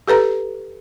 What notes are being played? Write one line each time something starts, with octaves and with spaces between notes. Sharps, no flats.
G4 A4 B4 A#5